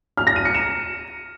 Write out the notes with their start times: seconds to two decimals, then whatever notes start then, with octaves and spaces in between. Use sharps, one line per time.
0.17 F6
0.27 A#6
0.36 D#7
0.45 C#7
0.54 E7